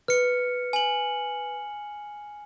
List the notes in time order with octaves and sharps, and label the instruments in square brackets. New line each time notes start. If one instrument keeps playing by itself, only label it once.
[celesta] B4 [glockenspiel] F6 C#7
[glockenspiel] G#5 F#7